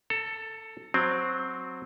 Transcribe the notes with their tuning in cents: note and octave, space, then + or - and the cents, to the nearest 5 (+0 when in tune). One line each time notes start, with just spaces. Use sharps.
A4 +10 A#5 -35
F#3 -10 C4 +0